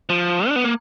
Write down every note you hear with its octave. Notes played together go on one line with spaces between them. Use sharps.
F3
D4
B3
A#3